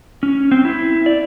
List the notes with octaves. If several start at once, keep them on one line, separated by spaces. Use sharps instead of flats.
C#4
C4
E4
D5